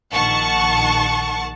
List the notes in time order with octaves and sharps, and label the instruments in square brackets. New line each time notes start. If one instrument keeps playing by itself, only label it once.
[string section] A#1 D#3 F#5 A5 C#6